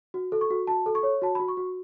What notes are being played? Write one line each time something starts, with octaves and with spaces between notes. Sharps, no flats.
F#4
A4
C#6
F#4
F#4 A5
A4
C#6
C#5
F#4 A5
F#4 B5
C#6
F#4